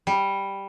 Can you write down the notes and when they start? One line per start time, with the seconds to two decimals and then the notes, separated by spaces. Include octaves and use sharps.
0.07 G3